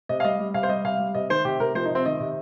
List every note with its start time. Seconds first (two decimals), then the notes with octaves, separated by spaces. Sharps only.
0.09 C3 D#5
0.20 F5
0.24 G3 D#5
0.39 G3
0.54 C3 F5
0.63 C5
0.69 G3 D#5
0.84 C3 F5
0.99 G3
1.15 C3 D#5
1.30 D#3 C5
1.45 C3 G4
1.60 C3 A#4
1.75 F3 C5
1.85 D#4
1.90 C3
1.95 C4
2.05 D#3 D#5
2.20 C3